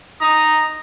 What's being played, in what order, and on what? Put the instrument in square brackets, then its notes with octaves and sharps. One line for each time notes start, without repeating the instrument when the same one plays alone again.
[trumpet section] D#4 D#6 [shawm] A#5